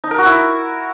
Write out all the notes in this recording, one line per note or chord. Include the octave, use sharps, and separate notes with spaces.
D#4
A#4
F#4
E4